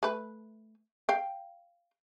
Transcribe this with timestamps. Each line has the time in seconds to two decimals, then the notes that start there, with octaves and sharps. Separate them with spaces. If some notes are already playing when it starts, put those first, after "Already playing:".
0.03 A3 B4
1.09 F5 G5